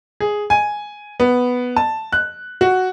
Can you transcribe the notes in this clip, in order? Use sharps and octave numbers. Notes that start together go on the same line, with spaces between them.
G#4
G#5
B3
A5
F#6
F#4